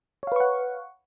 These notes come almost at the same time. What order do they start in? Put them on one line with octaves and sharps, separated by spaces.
C#5 F5 B4 C#6 F#5